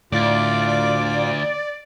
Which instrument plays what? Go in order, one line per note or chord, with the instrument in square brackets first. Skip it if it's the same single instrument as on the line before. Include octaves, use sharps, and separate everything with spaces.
[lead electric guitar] D2 [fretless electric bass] A2 [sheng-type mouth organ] F4 D6 [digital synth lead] D5